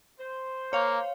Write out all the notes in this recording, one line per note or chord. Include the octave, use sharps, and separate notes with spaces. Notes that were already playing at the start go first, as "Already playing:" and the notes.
C5
A#3 C#5 F5